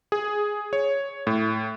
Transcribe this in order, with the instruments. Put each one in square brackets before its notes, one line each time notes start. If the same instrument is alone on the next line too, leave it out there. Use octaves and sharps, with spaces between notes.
[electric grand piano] G#4
C#5
A2